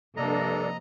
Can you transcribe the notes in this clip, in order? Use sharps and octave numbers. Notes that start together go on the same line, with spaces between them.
G2 C3 F3 A#3 D4 A4 D#5 A#5